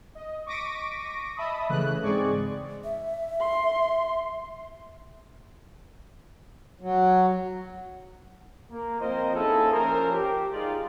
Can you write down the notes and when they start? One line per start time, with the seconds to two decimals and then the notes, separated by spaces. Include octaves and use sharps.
0.15 D#5
0.46 C#6 D6 A#6 B6 D7 D#7
1.37 D#5 E5 A5 B5 D#6
1.70 C#3 E3 A3 F#6
2.03 G#2 G#3 C4 G#4 D5 C#6
2.84 E5
3.40 C6
6.81 F#3
8.71 A#3
9.00 F3 C4 F4 A#4 C5 D#5
9.35 A#3 C#4 D#4 E4 G#4 A4
9.72 F3 C#4 A#4 C5
10.12 G4
10.52 G#3 D#4 F4 D5